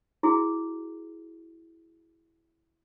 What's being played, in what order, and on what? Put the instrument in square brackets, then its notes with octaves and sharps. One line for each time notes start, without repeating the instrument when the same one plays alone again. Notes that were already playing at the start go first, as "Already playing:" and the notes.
[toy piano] E4 F#4 G#4